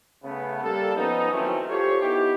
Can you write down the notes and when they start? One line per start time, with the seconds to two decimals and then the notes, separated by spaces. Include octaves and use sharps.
0.24 C#3 A3 B3
0.63 G3 A#3 A4
0.96 F3 B3 C#4 D#4
1.31 D#3 E3 F#3 A3 C4 C#4
1.70 F4 G4 A4 C5 C#5
2.01 B3 D#4 E4 G4